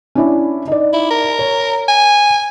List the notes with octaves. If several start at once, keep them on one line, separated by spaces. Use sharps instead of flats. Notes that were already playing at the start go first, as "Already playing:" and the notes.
C#4 D4 E4
D#4 D5
E4
A#4
C#5
G#5